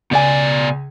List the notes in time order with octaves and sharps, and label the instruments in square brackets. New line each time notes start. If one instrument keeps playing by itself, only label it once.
[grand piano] C#2 G#5 [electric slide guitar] B2 D5